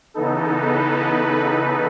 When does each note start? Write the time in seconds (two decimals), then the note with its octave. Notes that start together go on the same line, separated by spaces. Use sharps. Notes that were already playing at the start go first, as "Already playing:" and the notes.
0.14 C#3 E3 B3 D#4 A4
0.54 B4